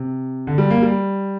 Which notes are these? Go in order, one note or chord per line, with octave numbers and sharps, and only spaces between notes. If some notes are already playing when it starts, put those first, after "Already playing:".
Already playing: C3
D3
G3
A#3
G3